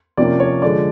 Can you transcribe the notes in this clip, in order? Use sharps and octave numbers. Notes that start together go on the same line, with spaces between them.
C3 F3 A#3 C#4 D5
C#5
D3 F3 G#3 D5